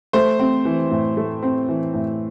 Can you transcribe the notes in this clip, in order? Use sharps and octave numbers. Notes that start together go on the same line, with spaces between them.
A3 C5
C4
E3
A2
A3
C4
E3
A2